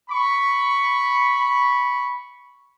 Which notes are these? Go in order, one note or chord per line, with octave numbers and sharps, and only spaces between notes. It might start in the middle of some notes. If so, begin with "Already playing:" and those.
B5 C#6